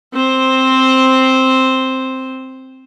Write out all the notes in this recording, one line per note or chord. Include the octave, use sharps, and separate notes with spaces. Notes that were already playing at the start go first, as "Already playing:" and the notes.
C4 C5